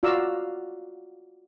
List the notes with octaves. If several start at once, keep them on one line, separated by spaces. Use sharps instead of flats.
F4 F#4 D5 F5 A#5 E6